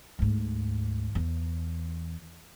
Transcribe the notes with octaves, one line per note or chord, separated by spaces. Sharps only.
D2 G#2
E2